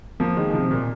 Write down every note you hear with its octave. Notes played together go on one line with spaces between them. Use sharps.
F3 A#3
D#3 G#3
G#3
C3 F3
C3
A#2